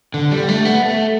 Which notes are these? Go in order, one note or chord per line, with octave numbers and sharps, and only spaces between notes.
D3
G3
A3
B3
A3